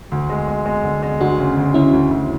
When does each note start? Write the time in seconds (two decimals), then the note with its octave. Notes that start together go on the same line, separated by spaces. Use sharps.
0.12 D2
0.30 G#3
0.48 G#3
0.66 G#3
0.84 D3
1.03 G#3
1.21 D2 D4 F#4
1.38 C#3
1.57 D2
1.74 D2 C#4 E4
1.93 D2
2.11 D2